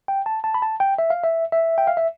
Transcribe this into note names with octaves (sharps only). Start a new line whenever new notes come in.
G5
A5
A5
B5
A5
G5
E5
F5
E5
E5
G5
F5
E5